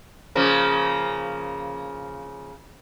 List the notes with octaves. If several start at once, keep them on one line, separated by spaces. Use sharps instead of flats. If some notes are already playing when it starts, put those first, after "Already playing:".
C#3 F3 A#3